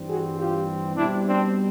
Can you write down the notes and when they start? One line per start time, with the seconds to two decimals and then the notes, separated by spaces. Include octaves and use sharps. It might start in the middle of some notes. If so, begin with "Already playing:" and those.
Already playing: G2 E3 G3 C4
0.09 F#4 G#4
0.38 F4 G4
0.96 B2 G3 C4 D4 E4
1.25 C4 D4